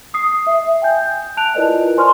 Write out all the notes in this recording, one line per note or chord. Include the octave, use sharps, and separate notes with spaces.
D#6 C7
E5
G5 G#5 G6
A5 F#6 D7 F7
E4 F4 A#4 B4 D5 D#5
C5 D5 G#5 C6 C#6 F6